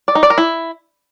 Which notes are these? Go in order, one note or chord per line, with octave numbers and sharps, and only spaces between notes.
D5
D#4
D5
A#4
E4